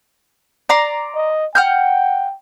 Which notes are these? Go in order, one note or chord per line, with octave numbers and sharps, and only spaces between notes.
D5 A#5 C6
D#5
F#5 G5 F6 G6